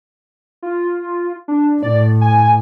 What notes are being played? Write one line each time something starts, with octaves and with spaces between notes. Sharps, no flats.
F4
D4
A2 D5
G#5